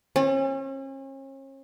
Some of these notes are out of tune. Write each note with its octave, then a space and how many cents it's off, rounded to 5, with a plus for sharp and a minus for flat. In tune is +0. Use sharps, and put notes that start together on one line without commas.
C#4 -40